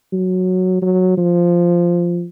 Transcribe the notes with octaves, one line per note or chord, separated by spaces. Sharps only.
F#3
F#3
F3